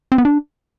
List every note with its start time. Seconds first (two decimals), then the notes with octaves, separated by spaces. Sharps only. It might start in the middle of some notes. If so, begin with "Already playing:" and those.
0.12 C4
0.18 B3
0.25 D4